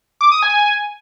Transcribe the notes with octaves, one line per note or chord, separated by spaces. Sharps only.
D6
D#6
G#5